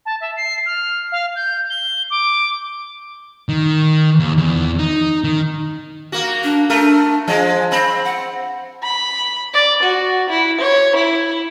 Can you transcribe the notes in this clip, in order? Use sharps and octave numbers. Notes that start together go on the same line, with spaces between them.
A5
E5
C7
F6
F5
G6
G7
D6
D#3
D#2
E2
D#4
D#3
A#3 F#4
D4
A3 D4 A#4
F3 G#3 D#5
C4 B5
F#5
B5
D5
F#4
E4
C#5
E4